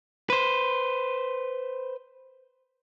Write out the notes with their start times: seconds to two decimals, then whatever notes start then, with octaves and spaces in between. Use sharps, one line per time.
0.30 B4 C5